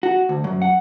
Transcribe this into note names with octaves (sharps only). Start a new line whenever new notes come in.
F#4
D2
F#2
F#5